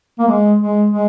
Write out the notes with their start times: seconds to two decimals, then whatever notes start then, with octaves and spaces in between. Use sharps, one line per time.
0.19 A#3
0.28 G#3
0.59 G#3
0.90 G#3